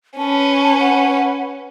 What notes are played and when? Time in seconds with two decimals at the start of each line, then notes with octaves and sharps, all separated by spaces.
0.18 C#4 B4 A5
0.80 F#5